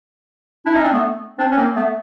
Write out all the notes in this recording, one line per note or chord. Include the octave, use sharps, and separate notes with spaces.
D4 E4
C#4 D#4
C4 D4
A3 B3
C4 D4
C#4
A#3 C4
A3 B3